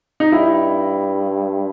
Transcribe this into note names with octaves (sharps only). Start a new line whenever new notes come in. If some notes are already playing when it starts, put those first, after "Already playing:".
D#4
G2 E4